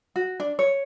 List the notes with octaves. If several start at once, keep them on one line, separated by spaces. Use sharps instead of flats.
F#4
D4
C#5